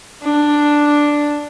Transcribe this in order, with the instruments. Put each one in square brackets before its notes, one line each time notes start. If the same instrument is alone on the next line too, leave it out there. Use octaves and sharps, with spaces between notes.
[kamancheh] D4